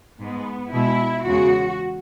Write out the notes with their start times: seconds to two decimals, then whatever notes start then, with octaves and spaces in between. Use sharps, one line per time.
0.21 G#2 G#3 B3
0.73 B2 G#3 E4
1.26 E2 C#3 G#3 F#4